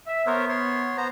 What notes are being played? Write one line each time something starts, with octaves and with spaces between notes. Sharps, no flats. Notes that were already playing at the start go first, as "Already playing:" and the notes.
E5
B3 A#4 C5 C#5
C#5 C6
B3 C5 A#5